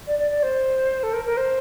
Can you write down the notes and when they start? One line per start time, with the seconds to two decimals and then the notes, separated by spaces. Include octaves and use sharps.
0.07 D5
0.19 D5
0.31 D5
0.43 C5
1.03 A4
1.13 A#4
1.25 A#4
1.37 C5